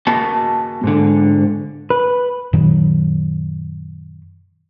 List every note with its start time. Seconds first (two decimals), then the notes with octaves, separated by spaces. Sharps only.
0.07 A#3 F#4 D#5 A5
0.84 G#2 D3
1.90 B4
2.53 F#2 A#2 D#3 F#3